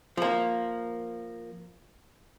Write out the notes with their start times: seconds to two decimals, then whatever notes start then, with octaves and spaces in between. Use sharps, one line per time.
0.17 F3 A#3